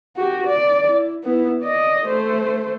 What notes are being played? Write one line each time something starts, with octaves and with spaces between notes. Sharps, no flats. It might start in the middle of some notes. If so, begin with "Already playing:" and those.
F#4 G4
D5
E4
B3 E4
D5 D#5
A3 C5